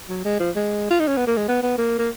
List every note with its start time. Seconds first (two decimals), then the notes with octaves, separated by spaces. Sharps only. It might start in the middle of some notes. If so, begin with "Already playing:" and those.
0.09 F#3
0.25 G#3
0.40 F3
0.56 G#3
0.90 F4
1.00 D#4
1.08 C#4
1.17 B3
1.27 A#3
1.37 G#3
1.48 B3
1.63 B3
1.78 A#3
1.99 A#3